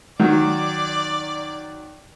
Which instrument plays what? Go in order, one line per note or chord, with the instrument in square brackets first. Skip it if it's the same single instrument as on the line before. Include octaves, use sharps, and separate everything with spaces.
[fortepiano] D#3 F#3 [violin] D5